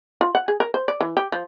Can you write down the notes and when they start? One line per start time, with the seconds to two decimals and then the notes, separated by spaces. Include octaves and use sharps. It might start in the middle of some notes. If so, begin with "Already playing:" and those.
0.21 F4
0.35 F#5
0.48 G#4
0.60 A#4
0.74 C5
0.88 D5
1.01 E3
1.17 G4
1.32 F3